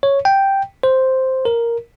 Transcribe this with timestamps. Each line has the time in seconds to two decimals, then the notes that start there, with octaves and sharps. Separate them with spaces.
0.03 C#5
0.25 G5
0.83 C5
1.45 A#4